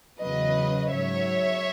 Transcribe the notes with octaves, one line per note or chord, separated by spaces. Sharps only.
E2 C#3 F#3 B4 D#5
G#2 F#3 C#5 E5